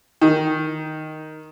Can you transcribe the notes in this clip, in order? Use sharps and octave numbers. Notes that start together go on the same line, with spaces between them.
D#3